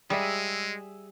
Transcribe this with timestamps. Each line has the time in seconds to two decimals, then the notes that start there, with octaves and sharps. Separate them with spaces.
0.10 G3 G#3 G#4 E5